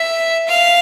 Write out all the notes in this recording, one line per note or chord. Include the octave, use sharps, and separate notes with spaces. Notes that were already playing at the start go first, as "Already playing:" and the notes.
Already playing: E5
F5